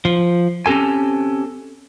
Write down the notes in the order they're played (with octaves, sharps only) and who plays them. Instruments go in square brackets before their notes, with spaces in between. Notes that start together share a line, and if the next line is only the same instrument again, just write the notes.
[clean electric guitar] F3
C4 C#4 G4 A4 G#5